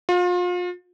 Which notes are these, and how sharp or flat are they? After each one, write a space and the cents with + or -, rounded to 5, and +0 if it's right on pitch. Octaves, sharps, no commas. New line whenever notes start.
F4 +35